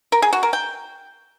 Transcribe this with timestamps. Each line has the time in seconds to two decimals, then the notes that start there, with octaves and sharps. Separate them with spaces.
0.12 A#4
0.22 G#4
0.33 F#4
0.43 A#4
0.53 G5